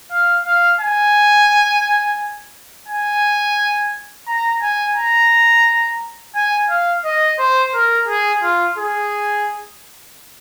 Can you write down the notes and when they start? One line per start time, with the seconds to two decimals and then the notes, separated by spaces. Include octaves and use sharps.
0.11 F5
0.46 F5
0.81 G#5
2.88 G#5
4.27 A#5
4.62 G#5
4.96 A#5
6.35 G#5
6.70 F5
7.05 D#5
7.39 C5
7.74 A#4
8.08 G#4
8.43 F4
8.78 G#4